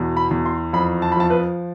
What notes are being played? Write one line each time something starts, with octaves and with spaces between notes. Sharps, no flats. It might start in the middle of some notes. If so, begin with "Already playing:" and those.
Already playing: E2 B2
B5
E2
C6
F2 B5
A5
B5
F3 A5
B4